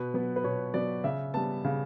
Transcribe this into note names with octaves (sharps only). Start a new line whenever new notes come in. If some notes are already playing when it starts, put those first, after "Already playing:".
Already playing: B2 B4
F#3 B3
B4
B2 C#5
F#3 B3 D5
C#3 E5
G3 B3 A5
C#3